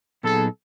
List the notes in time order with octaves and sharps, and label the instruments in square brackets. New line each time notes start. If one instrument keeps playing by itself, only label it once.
[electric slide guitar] A#2 F#3 B3 D#4 G#4 [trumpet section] A4